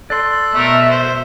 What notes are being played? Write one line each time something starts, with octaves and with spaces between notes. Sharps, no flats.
A4 D5 C6 F#6
B2 A3 A#4 E5
C5